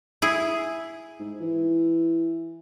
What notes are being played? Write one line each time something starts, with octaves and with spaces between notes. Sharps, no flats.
E4 G#4
G#2
E3